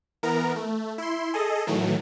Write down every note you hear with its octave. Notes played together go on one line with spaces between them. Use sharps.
E3 B3 A#4 A#5
A3
E4 C6
G#4 A4 D#5
A2 D#3 E3 F#3 A3